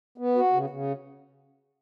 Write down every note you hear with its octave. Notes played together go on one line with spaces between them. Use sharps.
B3
F#4
C#3
C#3